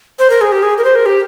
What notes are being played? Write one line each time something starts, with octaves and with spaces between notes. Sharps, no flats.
C5
A#4
G#4
G4
G#4
A#4
C5
A#4
G4